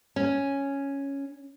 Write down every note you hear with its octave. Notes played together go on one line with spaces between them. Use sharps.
C#4